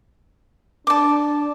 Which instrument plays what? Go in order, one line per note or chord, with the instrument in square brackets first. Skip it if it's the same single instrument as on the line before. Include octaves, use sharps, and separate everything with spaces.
[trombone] D4 [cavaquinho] A5 D6